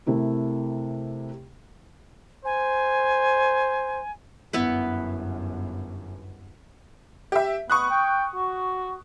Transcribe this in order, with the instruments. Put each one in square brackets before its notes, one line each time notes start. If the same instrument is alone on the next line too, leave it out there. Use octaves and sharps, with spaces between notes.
[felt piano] C3 A3 E4 A#4
[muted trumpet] C5 [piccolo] G#5
[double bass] G1 F#2 [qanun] B3 E4 B4
[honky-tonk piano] G4 E5
[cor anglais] B3 [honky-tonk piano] C#6 D#6 F#6
[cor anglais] G5
F#4